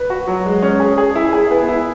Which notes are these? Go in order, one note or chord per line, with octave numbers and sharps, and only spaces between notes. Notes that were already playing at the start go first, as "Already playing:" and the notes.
Already playing: B4
F#4
F#3
G#3
C#4
G#4
G#4
E4
G#4
B3
E4